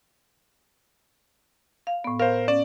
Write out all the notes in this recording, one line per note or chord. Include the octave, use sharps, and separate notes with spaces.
F5
A2 B3
A#4 C5 F5
C#4 D5